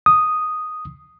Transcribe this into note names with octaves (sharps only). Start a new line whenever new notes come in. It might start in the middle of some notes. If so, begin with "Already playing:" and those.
D#6